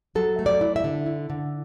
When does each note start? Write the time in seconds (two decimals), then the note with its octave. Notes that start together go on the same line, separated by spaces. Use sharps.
0.15 F#3 A4
0.39 A3
0.46 D5
0.61 E4
0.76 E5
0.84 D3
1.06 E4
1.30 D3